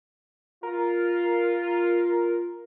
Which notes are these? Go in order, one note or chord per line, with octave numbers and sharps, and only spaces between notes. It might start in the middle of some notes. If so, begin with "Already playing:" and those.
F4 A#4